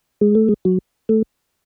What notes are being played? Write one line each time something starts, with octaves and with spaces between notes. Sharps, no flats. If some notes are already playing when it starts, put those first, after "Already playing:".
G#3
A3
G#3
F#3
A3